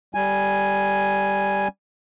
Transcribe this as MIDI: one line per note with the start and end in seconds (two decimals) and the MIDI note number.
0.15 1.68 55
0.15 1.68 80